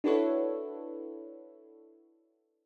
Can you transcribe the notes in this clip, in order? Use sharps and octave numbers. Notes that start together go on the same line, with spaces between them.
D4 E4 F#4 A4 B4 C#5